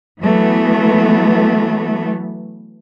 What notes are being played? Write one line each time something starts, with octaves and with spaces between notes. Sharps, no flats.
E3 F#3 A3 B3